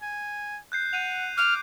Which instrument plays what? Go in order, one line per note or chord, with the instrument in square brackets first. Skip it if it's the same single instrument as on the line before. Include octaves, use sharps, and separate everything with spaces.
[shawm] G#5
[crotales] F#6 G6 C7
[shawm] F#5 [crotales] C7 D#7 F7
[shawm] D6 [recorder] F6